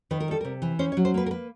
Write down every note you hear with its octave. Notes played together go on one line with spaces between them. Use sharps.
D#3 B4
A#4
G3 A4
C3 A#4
E3
C#4 C5
C#5
F#3
C5
A#3 B4
A#4
A#3 B4